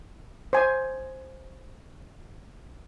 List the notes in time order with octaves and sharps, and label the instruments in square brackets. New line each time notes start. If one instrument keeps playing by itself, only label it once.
[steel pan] C5 G#5